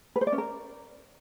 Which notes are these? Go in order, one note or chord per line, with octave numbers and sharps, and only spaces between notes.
B4
C5
D5
C#4
A#4